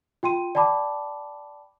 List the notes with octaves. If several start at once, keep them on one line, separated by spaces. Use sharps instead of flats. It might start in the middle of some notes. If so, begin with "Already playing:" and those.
F4 G5 C6 D#7
D5 G5 A5 B5 D6